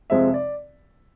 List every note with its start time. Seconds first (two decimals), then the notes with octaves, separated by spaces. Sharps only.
0.10 F2 C3 F3 G#3 C4 E5
0.34 D5